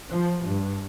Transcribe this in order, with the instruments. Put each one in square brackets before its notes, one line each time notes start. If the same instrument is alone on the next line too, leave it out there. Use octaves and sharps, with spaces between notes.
[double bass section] F3
G2